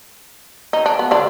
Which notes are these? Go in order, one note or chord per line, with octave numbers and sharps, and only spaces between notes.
D#4
D4
B3
D3 D4